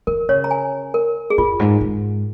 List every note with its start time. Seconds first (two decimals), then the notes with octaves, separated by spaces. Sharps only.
0.07 F3 A#4
0.29 C#3 C#5
0.44 A#5
0.51 G#5
0.94 A#4
1.30 G#4
1.38 F2 F4
1.60 G#2
1.81 G#2